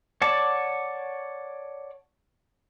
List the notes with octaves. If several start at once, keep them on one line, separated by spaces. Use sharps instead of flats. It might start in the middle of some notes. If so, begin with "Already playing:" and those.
C#5 D5 F#5 A5 D6